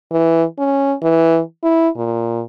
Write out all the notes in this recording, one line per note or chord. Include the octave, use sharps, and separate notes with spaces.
E3
C#4
E3
E4
A#2